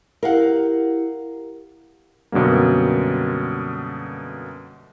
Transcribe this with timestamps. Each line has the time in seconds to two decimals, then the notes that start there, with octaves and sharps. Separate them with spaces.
0.23 E4 G4 A#4 F5 F#5
2.32 F#2 B2 D3 G3 A#3